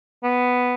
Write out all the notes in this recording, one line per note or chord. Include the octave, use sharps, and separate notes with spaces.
B3